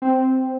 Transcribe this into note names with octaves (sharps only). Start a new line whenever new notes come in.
C4